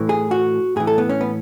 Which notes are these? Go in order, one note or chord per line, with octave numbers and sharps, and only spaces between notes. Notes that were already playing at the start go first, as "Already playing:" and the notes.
Already playing: A2 E3
G#4
F#4
A2 E3 G#4
A4
B3
C#4
B3